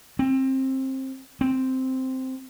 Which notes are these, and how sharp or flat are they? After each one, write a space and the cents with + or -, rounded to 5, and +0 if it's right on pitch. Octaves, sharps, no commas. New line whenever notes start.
C4 +20
C4 -5